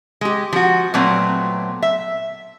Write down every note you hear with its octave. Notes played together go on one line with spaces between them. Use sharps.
G#3 G4
F3 F#4
A#2 F#3 A3 B3 C4
E5